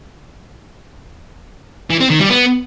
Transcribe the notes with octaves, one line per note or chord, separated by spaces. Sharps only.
E3
C4
D#3
G3
B3